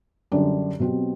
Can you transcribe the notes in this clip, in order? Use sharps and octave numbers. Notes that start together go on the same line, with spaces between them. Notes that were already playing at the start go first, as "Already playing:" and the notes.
F#2 D3 G3 D4 G4
B2 F#3 C4 G4